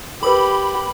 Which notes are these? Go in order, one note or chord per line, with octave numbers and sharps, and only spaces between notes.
G4 G#4 A#4 B4 B5